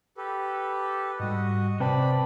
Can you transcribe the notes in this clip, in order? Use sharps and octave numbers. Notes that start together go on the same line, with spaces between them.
G4 A4 B4
G#2 G3 F#4 D#5
C3 B4 C5 D5 G5 A5 B5